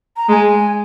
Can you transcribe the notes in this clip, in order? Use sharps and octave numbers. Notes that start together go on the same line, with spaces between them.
A#5
G#3 G#5 A#5